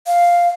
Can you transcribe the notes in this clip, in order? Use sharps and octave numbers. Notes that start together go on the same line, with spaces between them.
F5